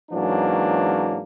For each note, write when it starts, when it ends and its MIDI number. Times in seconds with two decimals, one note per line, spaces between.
0.11 1.23 44
0.11 1.23 52
0.11 1.23 54
0.11 1.23 58
0.11 1.23 61
0.11 1.23 62